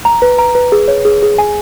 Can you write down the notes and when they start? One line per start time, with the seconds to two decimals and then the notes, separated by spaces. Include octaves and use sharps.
0.05 A#5
0.22 B4
0.39 A#5
0.55 B4
0.72 G#4
0.88 C#5
1.05 G#4
1.22 G#4
1.38 G#5